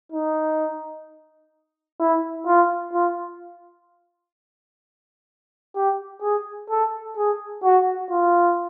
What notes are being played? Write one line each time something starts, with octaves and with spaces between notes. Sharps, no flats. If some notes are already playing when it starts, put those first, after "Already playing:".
D#4
E4
F4
F4
G4
G#4
A4
G#4
F#4
F4